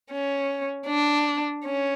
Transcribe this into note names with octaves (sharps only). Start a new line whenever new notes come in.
C#4
D4
C#4